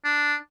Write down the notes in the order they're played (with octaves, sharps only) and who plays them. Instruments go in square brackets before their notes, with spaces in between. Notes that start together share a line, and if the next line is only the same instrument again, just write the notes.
[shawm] D4